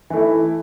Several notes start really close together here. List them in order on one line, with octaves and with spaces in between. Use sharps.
E3 A3 E4